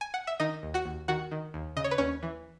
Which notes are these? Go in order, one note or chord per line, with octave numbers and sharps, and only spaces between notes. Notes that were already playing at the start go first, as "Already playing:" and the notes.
G#5
F#5
E5
D#3 D#4 D#5
D#2
F#4 F#5
D#2
D#3 F#4 F#5
D#3
D#2
C#3 D#5
C#5
B4
D#2 C#4 C#5
E3